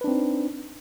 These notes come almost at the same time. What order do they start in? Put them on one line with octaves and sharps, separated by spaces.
B4 D4 C4 D#4